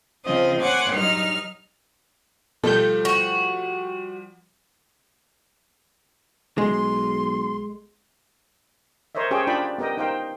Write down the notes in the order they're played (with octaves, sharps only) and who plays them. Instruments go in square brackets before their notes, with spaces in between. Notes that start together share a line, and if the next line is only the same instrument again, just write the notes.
[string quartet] C#3 F3 C4 D#5
C#5 F#5 G#5 C6 D6
G2 F#3 D#4 F6
[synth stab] B2 G6 [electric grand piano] F3 G3 [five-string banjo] A3 A4
[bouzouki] F#4
[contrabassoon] B1 [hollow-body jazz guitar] G#3 [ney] C6
[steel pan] A#4 C5 C#5 D#5 E5
C#4 G4 G#4 C5 C#5 G5
D4 F4 D5 G5 A5 B5
B3 G4 A#4 D#5 G5
D#4 A#4 C5 F5 G5